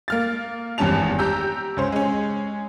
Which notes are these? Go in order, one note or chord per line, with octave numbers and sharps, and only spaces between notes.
A#3 F6 A6
G#1 E2 G2 C#4 A5 F7
G4 A#5 E6 G6
C#2 C#4 C5
G#3 C#4